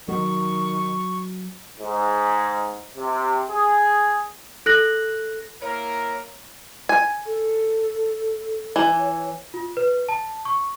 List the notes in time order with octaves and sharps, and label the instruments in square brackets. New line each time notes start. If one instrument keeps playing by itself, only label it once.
[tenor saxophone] D#3 [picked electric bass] F#3 [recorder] C#6
[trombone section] G#2
C3
G#4
[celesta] A4 F#6 A#6 F#7
[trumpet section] A#3 E4 A#4 [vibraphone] C#5
[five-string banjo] G#5
[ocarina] A4
[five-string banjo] E3
[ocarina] C#5
[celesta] F4
B4
A5
C#6